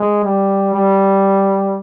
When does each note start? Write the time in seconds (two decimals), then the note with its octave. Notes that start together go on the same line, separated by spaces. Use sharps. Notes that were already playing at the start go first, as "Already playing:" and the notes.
Already playing: G#3
0.24 G3
0.74 G3